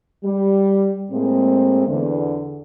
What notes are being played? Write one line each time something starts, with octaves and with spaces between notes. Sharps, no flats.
G3
A2 G#3 A#3 C4
E2 D3